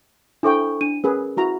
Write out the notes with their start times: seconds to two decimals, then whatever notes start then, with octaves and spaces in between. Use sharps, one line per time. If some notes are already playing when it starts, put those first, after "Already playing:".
0.43 D4 E4 A4 C5 G5 C#6
0.81 D4 D#7
1.04 C#4 G#4 A#4 B4
1.37 E4 F#4 A#5